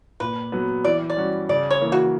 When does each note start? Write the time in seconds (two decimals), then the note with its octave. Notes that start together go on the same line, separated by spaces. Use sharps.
0.20 A#2 B4
0.52 F#3 B3
0.84 E3 D5
1.10 D5
1.17 G3 C#4 F#4
1.49 C#3 D5
1.70 C#5
1.81 E3 A#3
1.92 F#4